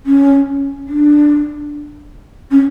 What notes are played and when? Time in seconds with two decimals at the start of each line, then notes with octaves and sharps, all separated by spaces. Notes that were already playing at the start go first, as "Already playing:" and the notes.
0.05 C#4
0.87 D4
2.51 C#4